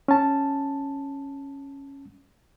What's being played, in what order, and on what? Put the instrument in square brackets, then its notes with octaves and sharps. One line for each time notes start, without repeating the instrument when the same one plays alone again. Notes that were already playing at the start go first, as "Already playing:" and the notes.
[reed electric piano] C#4 A5